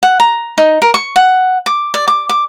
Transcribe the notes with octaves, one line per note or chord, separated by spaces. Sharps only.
F#5
A#5
D#4
A#4
C#6
F#5
D6
D5
D6
D6